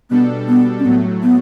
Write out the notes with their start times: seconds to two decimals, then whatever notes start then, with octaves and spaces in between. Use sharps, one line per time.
0.10 B2 G3 B3 D4 A4
0.48 B3
0.79 C#4
0.85 A2 F#3 A3 B3
1.23 B3